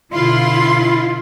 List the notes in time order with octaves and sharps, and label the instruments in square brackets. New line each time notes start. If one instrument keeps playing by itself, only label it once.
[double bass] B2 D3 [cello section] E4 F4 F5 [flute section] B5 C6